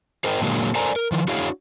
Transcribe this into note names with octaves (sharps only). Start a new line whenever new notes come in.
G#4 A#4 C5 D#5 G5
A#2 D3 F#3 G#3 A#3
A4 A#4 C5 D5 G#5 A#5
A#4
D#3 F3
D4 E4 F#4 G#4 C#5 F5